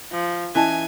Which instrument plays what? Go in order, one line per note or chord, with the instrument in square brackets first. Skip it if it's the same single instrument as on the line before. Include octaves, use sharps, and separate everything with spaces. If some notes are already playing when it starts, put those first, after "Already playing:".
[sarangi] F3
[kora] E3 [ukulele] C#4 D#5 A5 [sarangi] G#5